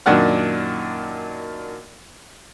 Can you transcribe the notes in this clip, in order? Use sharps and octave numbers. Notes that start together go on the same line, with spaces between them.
F#2 A#2 D#3 D4 F#5 F6